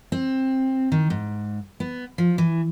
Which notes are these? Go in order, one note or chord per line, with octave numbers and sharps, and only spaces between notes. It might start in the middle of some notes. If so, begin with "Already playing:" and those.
C4
D#3
G#2
B3
F3
E3